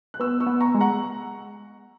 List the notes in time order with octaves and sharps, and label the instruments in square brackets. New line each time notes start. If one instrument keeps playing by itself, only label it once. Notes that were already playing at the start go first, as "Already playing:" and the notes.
[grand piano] F#6
[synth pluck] B3 [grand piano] C#6 E6
[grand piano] C#6 E6
[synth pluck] B3
[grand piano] A#5 C#6
[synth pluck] G#3
[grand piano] F#5 A#5